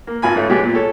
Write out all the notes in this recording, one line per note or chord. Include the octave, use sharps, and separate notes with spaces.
A#3
G#1 F4 G#5 B5
G#2 A3 C#4
B2 F#3 G#3 G4
A#2
A4 C#5